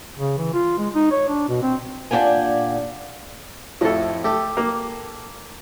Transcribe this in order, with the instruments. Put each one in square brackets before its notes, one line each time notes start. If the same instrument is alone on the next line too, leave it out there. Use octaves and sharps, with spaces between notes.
[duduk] C#3
E3
F4
G#3
D#4
C#5
D4
B2
C4
[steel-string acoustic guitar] A#2 D4 G4 F#5 G#5
[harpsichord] F2 A2 [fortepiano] F3 A4
[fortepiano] A3 [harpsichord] G4 A4
[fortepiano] A#3